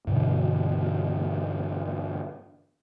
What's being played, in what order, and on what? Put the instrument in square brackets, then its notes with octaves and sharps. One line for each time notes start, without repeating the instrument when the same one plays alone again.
[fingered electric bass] G2 B2 D3 E3